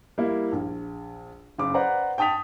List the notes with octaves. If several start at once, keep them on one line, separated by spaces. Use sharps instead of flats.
G3 A#3 E4
A#1
F#1 C#3 D6
B4 C5 D5 F#5 A#5
G5 A5 D#6 B6 F7